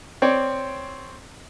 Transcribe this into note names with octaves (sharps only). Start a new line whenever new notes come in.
C4 C#5 D5